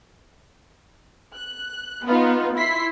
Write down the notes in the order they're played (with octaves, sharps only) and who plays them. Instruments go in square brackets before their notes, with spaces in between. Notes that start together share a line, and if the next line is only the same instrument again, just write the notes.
[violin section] F#6
[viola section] B3 [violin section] D#4 F4 B4
[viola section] E4 [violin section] C6 B6 C7